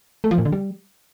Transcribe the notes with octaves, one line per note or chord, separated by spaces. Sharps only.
A3
F3
A#2
D3
G3